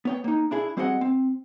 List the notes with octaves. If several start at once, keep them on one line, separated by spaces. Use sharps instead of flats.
B3 C#5 G5
A#3 D#4
D4 E4 G#4
G3 C4 F#4 G#4 D#5 F#5
C4